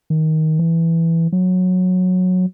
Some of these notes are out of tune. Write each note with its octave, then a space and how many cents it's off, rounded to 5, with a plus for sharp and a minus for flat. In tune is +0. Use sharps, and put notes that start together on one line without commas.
D#3 +15
E3 +5
F#3 -15